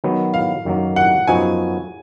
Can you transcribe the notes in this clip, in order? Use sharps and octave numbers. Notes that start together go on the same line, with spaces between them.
D#3 F#3 B3
F5
F#2 D#3 F#3 A#3
F#5
F#2 F3 B3 D#4 F#4 G#5